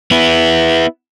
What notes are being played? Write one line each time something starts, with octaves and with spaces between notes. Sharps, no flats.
B3 E4